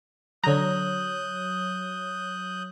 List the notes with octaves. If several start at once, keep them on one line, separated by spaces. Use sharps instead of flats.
D3 F#3 C#5 A#5 D#6 F#6 G6